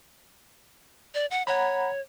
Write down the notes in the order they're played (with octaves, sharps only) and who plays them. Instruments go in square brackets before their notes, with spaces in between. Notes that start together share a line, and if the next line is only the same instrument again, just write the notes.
[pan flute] D5
F#5
[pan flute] C#5 [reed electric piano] F#5 A#5 B5